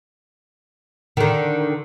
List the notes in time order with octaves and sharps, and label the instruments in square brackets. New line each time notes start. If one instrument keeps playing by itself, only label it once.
[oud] D3 D#3